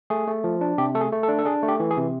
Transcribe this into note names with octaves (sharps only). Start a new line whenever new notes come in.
A3 G#4
A3
F3
D4
C3 G4
A3 A4
G#4
A3
A4
D4
A4
D4 G#4
A3
G4
E3
G#4
C3